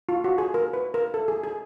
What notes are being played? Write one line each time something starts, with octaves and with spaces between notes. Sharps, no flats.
F4
F#4
G#4
A#4
B4
A#4
A4
G#4
G#4